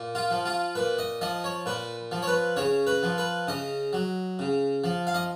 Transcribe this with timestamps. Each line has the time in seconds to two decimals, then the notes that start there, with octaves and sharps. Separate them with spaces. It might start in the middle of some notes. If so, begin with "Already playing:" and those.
Already playing: A#2
0.15 F4
0.30 F3
0.45 F4
0.75 A#2 B4
0.99 D#5
1.21 F3 D#5
1.44 C#5
1.66 A#2 B4
2.12 F3
2.22 C#5
2.27 B4
2.56 C#3 C#5
2.87 B4
3.03 F3
3.18 B4
3.47 C#3 D#5
3.93 F#3
4.39 C#3
4.84 F3
5.07 F5
5.14 D#5